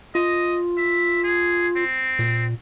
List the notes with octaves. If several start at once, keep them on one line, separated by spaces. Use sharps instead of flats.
F4 D#5
E5
G#4
C4
A#2